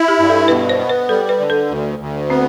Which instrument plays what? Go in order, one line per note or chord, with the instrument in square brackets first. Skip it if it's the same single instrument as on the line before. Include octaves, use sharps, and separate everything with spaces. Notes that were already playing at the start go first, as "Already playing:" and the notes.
Already playing: [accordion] E4
[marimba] G4
[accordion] G2
[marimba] A4
[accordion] B2 [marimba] B4
[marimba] C5
[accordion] B3
[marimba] B4
[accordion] G3 [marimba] A4
[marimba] B4
[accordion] D3
[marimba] A4
[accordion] D2
D2
[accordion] B3 [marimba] C4